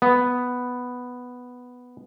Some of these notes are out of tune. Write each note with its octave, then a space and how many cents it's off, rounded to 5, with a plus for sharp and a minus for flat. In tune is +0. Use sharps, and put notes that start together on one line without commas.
B3 +0